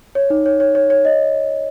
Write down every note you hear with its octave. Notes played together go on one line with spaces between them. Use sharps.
C#5
D#4
C#5
C#5
C#5
C#5
D#5